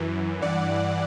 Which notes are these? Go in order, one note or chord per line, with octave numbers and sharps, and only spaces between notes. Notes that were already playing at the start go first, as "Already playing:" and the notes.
Already playing: F#2 E3
G2 E3 D5 F#5